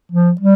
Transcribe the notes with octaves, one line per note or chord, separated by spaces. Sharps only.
F3
G3